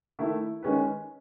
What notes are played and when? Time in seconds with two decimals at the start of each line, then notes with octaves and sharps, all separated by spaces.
0.19 D#3 A3 E4
0.62 D#3 G#3 C#4 G#4 B4